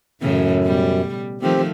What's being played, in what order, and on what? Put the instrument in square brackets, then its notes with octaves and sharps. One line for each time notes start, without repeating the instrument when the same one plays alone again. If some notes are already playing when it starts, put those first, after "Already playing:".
[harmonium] F#2 [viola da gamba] A2 C#3 E3
[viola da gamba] B2 G3
[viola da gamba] D#3 F3 A3 [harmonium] C4 G4